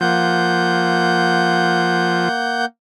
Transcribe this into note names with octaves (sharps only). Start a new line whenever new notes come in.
F3 A#3 F#5 G6